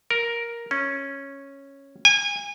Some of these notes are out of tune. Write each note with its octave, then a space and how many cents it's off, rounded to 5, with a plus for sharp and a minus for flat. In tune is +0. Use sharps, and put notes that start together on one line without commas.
A#4 +5
C#4 -5
G#5 -30